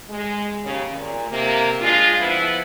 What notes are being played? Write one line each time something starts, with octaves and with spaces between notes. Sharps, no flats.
G#3
D#2 C#3
A#2
C3 A#3
G#3 D4 F4
F3 B3 E4